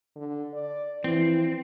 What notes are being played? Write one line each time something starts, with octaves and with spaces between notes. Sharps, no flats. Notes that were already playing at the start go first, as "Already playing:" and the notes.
D3
D5
E3 F3 C4